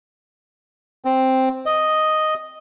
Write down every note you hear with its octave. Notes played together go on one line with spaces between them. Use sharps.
C4
D#5